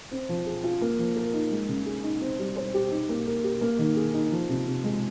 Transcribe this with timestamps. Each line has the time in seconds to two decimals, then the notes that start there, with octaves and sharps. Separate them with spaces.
0.11 C4
0.29 F3
0.46 G#4
0.64 F4
0.81 A#3
0.99 F3
1.16 A#4
1.33 D#4
1.51 G#3
1.69 C#3
1.86 G#4
2.04 D#4
2.21 C4
2.39 G3
2.56 C5
2.74 G4
2.91 D#4
3.09 A#3
3.27 A#4
3.44 G4
3.61 A#3
3.79 D#3
3.97 G#4
4.14 D#4
4.32 F3
4.49 C3
4.67 C3
4.84 G#3